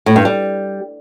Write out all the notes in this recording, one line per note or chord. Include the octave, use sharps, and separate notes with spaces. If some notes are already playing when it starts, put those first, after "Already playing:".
A2
G2
G3